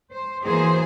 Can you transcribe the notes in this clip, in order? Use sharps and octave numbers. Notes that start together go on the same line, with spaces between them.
C5
E3 F#3 A#3 G#4 C5